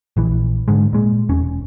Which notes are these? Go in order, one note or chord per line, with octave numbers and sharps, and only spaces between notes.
A#1 E3
G#2 D3 G#3
A#2 G#3
E1 C#4